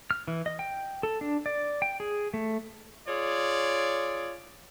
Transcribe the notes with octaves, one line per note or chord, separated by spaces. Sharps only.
F6
E3
D#5
G5
A4
D4
D5
G5
G#4
A3
F4 G#4 C#5 D5